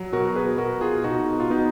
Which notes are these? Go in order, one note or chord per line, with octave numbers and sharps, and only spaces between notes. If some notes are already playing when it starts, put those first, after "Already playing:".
Already playing: F#3
B2 F#4 A#4
G#4 B4
B2 F#4 A#4
F4 G#4
B2 D#4 F#4
F4
B2 B3 D#4